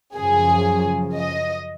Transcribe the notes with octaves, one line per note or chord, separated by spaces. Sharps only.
F#2 C#3 F3 G#4
D#5